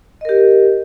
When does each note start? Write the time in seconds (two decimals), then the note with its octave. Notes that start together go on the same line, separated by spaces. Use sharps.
0.21 D#5
0.25 A#4
0.29 G4